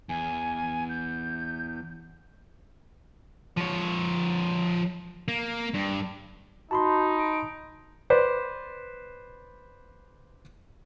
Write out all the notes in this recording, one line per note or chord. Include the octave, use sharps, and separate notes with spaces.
E2 G#5
G6
F3 C#5
A#3
G2
D#4 F#4 A5 B5 C6
D7
B4 C5 D5